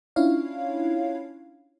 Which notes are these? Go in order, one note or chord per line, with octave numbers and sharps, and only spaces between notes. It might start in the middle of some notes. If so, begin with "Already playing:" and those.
C#4 D4 E4 F4 C#5 F5